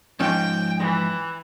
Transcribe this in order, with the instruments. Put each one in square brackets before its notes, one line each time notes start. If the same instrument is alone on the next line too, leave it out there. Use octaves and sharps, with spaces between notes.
[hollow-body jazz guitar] G#2 F3 C#4 [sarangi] G5
[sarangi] E3